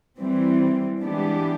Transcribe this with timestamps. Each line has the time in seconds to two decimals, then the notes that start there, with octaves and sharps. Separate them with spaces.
0.17 E3 G3 C4
1.03 E3 G#3 B3 D4 G4